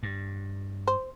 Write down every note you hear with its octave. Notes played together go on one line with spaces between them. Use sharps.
G2
C5